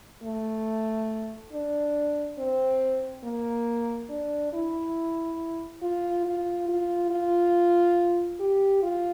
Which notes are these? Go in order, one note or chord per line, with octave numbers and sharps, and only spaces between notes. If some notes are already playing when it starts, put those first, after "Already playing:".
A3
D4
C4
A#3
D4
E4
F4
F4
F4
F4
G4
F4